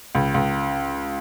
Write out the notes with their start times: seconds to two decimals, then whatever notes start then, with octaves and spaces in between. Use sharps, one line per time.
0.15 C#2
0.34 C#2